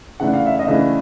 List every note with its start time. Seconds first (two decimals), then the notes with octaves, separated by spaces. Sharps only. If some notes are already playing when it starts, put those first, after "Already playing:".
0.20 C#3 E3 A3 D4 F#5
0.34 F5
0.46 E5
0.59 D#5 F5
0.67 C#3 E3 A3 D4